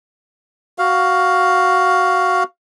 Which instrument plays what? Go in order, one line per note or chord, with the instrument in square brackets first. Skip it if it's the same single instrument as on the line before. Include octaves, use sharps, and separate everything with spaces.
[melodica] F#4 F5